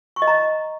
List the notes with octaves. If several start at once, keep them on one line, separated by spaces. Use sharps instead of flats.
C#6
D#5
A#5